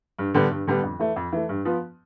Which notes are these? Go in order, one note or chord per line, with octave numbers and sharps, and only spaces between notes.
G2
D3 G3 B3 D4
G2
D3 G3 B3 D4
F2
E3 A3
F2
E3 A3
G2
F3 B3